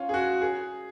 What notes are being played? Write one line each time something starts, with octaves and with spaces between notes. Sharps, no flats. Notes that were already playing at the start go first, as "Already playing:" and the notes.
Already playing: C#4 F4
G#4
F#4
G#4